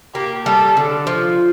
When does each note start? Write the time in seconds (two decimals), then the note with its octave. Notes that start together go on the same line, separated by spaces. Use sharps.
0.15 A#3 G4
0.45 G3 A4
0.77 D3
1.07 F3